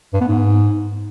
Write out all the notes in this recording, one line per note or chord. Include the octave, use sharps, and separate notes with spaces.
G2
B3
G#2